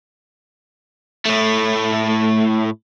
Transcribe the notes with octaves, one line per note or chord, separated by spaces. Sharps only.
A2 A3